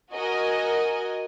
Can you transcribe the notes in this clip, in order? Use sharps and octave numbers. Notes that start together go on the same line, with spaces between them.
F#4 A#4 D#5 G#5